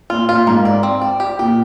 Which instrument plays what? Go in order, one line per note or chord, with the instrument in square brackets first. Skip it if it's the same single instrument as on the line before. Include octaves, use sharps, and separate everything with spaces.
[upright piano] A#2 [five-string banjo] F4
[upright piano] A#2 [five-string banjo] F4
[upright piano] G#2 [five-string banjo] A#3
[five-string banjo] D5
C4
D5
G4
[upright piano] A#2 [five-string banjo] G4